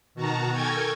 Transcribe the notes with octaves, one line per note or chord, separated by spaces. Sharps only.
B2 D#3 F#4 A5 A#5
A4 A#4 G5 G#5 C#6 G#6